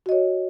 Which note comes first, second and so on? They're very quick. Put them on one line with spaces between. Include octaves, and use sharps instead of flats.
F#4 D#5 C#5